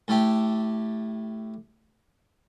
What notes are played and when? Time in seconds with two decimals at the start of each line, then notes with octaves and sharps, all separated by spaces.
0.08 A2 A3 G4